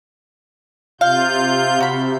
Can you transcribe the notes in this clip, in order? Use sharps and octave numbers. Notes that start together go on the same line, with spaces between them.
C3 F4 F5 G6
C3 F#4 B5